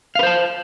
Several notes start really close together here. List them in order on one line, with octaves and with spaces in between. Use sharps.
F5 B4 C5 A5